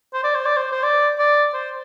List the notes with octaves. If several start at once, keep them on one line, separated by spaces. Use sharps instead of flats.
C5
D5
C5
D5
C5
C5
D5
D5
C5